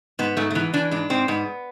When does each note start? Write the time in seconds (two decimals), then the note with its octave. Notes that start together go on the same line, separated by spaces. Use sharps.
0.19 G#2 B3
0.37 G#2 A3
0.50 A3
0.55 E3 B3
0.74 E3 D4
0.91 G#2 D4
1.10 G#2 C4
1.28 G#2 B3